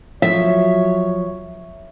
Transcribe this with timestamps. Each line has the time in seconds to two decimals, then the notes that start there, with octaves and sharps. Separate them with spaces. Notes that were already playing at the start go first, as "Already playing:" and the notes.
0.22 F3 F#3 C#5 E5